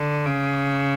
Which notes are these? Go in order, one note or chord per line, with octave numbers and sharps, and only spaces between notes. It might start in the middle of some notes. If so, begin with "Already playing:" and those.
Already playing: D3
C#3